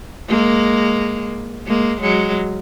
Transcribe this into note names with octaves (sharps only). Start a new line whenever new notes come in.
G#3 A#3
G#3 A#3
F#3 G#3